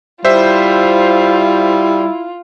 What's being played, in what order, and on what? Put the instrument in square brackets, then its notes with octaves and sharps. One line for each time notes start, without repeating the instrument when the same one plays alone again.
[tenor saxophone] G3 [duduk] E4 [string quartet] F4 [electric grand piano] C5 E5